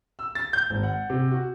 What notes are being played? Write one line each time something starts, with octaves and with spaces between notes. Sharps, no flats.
E6
A6
G6
G#1
F#5
C3
F#4